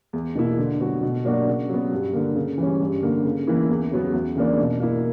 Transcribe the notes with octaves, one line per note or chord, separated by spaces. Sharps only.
E2
B2 A#3 E4
D3
F#3 B3 F#4
B2
F#3 A#3 D4 F#4
C#3
F#3 B3
G2
D3 A#3
C#3
E3 G3 C#4
G2
D3 A#3
C#3
E3 A#3 E4
E2
C#3 F#3 B3 F#4
E2
C#3 E3 A#3 D4
B2
A#3 E4